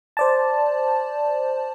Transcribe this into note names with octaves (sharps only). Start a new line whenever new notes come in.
C5 D5 A5